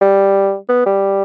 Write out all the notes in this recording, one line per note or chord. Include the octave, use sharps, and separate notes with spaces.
G3
B3
G3